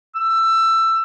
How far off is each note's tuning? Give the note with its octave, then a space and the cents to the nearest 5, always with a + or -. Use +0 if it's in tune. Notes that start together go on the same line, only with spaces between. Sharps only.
E6 +15